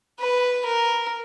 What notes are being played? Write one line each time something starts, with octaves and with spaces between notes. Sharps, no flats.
B4
A#4